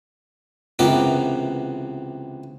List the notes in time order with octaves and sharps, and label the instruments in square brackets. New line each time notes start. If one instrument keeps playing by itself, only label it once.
[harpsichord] C#2 C3 E3 B3 G4 A#4